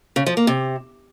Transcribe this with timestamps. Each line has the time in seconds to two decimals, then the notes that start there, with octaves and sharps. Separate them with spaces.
0.16 C#3
0.26 F3
0.37 A#3
0.47 C3